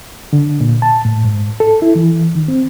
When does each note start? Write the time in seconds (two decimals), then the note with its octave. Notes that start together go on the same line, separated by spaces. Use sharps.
0.33 D3
0.60 A#2
0.82 A5
1.05 A2
1.25 G#2
1.60 A4
1.82 E4
1.96 E3
2.35 D#3
2.48 C4